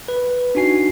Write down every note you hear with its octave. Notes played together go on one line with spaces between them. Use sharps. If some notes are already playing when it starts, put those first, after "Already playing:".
B4
D4 D#4 F#4 G#5 C7